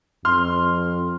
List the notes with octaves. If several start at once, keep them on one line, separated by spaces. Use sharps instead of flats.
F2 C6 F6